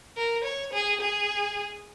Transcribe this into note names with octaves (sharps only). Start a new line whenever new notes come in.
A#4
C#5
G#4
G#4